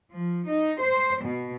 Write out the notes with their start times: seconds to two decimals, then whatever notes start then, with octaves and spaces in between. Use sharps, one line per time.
0.14 F3
0.49 D#4
0.81 C5
1.23 B2